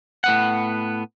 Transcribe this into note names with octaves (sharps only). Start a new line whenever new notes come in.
A2 B3 F#5